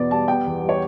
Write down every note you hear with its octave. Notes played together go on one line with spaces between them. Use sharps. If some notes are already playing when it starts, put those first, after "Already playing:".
Already playing: E2 B2 B3 D5
G3 A5
B3 G5
E2
G3
C#5